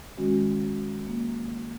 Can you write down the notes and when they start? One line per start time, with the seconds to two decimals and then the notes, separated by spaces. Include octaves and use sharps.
0.18 D#3 G#3 C#4 F#4
1.07 A#3